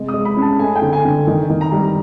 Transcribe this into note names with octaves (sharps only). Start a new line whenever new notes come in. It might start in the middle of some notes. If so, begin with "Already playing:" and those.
Already playing: C3 G#3
D#6
G#3
B5
C#4 A5
A3 G#5
G5
D3
G#5
D3
D#3
D#3
A#5
G3